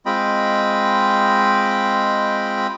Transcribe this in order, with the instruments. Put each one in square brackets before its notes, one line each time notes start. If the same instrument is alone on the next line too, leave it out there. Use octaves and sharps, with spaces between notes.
[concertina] G#3 C4 F4 D#5 G5 B5